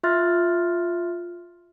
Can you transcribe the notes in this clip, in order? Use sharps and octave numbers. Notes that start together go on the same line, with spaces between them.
F4 E5 C6 F6 F#6 A6